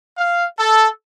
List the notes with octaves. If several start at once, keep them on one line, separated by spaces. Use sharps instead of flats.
F5
A4